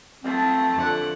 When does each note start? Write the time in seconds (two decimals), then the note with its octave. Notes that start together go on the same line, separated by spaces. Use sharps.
0.24 A3 C4 A5
0.74 F2 D3 F#5